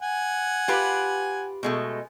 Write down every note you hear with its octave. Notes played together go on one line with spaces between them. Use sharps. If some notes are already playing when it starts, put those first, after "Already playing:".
F#5 G#5
F4 G4 B4
B2 G#3 A3